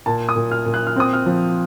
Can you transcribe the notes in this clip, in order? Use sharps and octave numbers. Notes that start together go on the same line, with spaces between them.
A#2 A5
D#6
A#2
F6
A#2
F#6
F6
C4 D#6
F6
F3